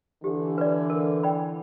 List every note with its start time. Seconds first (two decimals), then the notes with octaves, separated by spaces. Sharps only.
0.24 D3 E3 G4
0.58 B4 D5
0.90 A#4
1.23 D5 G5 B5